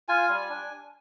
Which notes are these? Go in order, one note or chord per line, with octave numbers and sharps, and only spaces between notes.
F4 G#5
G3
D4